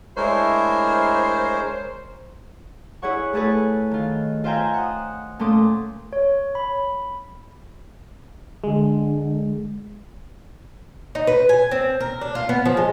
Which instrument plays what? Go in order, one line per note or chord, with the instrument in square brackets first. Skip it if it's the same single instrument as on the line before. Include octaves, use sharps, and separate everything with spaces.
[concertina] G#3 A#4 C#5 [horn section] A3 D4 E4 [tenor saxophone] C5
[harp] E4 G#4 C#5 F#5 C#6
A3 E4 G#4 A4 B4 C#5
D#3 F4
F4 C5 E5 G5 G#5 A#5
F#5 D#6
A#2 A3 C#4 C6 D6 D#6
[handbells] C#5
B5
[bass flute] D3 [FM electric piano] G#3
[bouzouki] D#4
B4
G#5
C4
A#4
D4
F4
B3
F3
G#3